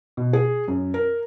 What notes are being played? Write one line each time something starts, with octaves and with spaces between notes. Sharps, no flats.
B2
G#4
F#2
A#4